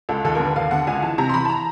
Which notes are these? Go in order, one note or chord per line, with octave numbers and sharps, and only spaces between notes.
C#2 A4
D#2 A4
D3 A#4
B4
D#2 F5
D3 F#5
C#2 G#5
E3 A5
C3 A#5
C6
E3 B5
A5
A#5